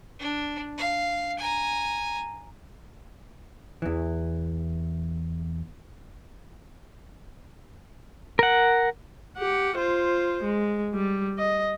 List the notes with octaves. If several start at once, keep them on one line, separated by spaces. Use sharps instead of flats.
D4
F5
G#5 A#5
E2 E3
A#4 F#5
G4 F#5
F4 C5
G#3
G3
D#5